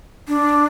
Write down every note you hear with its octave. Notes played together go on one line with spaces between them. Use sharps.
D4